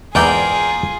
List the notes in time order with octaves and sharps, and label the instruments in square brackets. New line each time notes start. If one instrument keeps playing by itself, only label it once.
[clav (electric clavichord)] E2 G#2 E3 [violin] F4 G#4 [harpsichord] A#4 D5 G5